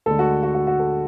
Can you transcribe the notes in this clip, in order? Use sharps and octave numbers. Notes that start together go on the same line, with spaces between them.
D2 D3 G#3 A4
F#4
F#4
F#4
F#4
A4